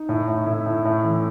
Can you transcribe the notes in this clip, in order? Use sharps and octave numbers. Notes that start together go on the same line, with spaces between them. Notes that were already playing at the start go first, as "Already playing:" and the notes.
Already playing: D#4
A2
A2
A2 E4
A2
A2
E3